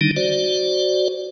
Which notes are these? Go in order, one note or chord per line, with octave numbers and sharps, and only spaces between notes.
D3 D#3 G3 D4 D#4
F#4 C5 D5